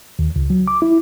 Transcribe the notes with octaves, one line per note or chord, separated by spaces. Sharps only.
D#2
C#2
F#3
D6
E4